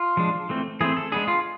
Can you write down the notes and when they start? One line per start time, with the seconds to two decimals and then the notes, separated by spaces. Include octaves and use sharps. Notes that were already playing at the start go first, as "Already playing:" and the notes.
Already playing: F4
0.17 F3 G#3 D4
0.49 E3 A3 C4
0.81 E3 A3 C4 G#4
0.97 A4
1.12 G#3 B3 D4 G#4
1.28 F4